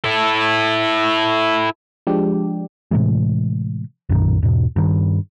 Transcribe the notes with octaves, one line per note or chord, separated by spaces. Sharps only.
E4 A4
F3 G#3 D4 G4
A2 C3 E3 G#3
B1 F#2 A#2 D#3
E2 G#2 B2
G2 D#3